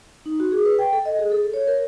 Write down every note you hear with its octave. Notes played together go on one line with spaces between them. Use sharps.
D#4
F#4
G#4
B4
G5
A4
D#5
G#4
A4
C#5
A#4